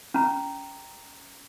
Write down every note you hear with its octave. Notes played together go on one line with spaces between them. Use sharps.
C#4 A#5